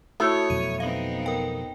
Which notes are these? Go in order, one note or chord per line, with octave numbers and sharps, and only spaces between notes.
A3 E4 F#4 C#5 D#6
F2 B2 F#3 D#7
B3 C4 D#4 F5
A#4 G5